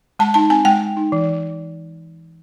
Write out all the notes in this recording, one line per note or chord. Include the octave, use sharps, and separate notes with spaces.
G#3 A5
D#4 A5
C4 G#5
G#3 G5
G#3
D#4
E3